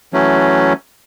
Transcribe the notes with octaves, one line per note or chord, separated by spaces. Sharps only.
E3 F#3 A3 C#4